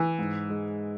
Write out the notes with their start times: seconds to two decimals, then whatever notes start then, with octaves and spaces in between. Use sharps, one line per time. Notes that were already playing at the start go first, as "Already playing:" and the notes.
Already playing: E3
0.18 G#2
0.49 G#3